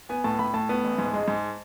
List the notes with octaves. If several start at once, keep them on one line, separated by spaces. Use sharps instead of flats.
B3 G#5
A2 A5
A2 B5
A2 A5
B3
A1
G#2
G#3
G#2